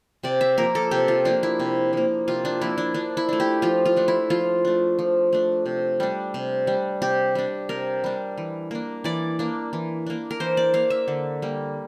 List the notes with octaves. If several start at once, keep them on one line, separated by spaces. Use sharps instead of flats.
C3 D5
E5
F3 A#3 A#4
A4
C3 G4
F4
F3 A#3 D4
E4
C3
F3 A#3
C3 F4
D4
F3 A#3 E4
D4
F3 D4
E4
A3 D4
G4
F3 F4
F4
A3 D4
E4
F3 F4
A3 D4
F3
A3 D4
C3
G3 D4
C3
G3 D4
C3 G4
G3 D4
C3 A#4
G3 D4
E3
A#3 D4
E3 D5
A#3 D4
E3
A#3 D4
A#4
E3 C5
D5
A#3 D4 F5
E5
D3
G3 A#3